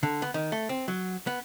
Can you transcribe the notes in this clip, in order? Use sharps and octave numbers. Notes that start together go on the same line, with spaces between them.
D3
B3
D#3
A3
C4
F#3
B3